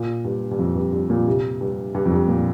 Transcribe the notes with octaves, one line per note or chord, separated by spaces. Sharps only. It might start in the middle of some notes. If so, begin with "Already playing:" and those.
Already playing: A#2
G2
G2
F2
G2
G2
A#2
C3
G2
G2
F2
G2
A#2